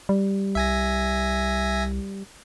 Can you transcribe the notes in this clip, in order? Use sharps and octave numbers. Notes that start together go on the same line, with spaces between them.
G3
C2 E5 G#5 A#6